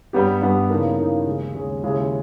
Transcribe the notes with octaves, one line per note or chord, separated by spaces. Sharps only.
G2 G3 B3 G4
G2 G3 B3 G4
C#3 E3 A#3 D#4 A#4
C#3 E3 A#3 D#4 A#4
D#2 C#3 G#3 C#4
D#2 C#3 G#3 C#4
D#2 C#3 G#3 C#4 E4